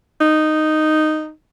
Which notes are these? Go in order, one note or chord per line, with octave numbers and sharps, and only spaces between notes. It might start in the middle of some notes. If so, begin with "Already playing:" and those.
D#4